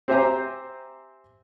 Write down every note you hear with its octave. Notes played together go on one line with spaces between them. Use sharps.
C4 G4 C5 E5 G#5 A#5